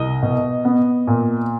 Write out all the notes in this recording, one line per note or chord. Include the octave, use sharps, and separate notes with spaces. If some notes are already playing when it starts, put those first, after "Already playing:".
Already playing: C2 D#5
B2
B3
A#2